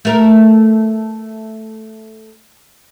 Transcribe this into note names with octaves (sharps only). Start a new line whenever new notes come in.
A3 A#4